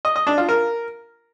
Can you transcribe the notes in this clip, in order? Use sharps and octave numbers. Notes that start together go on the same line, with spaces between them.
D#5
D#5
D4
F4
A#4